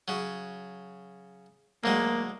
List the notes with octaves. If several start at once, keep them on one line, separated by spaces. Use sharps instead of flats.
C#3 F#3
D2 F#3 G#3 A#3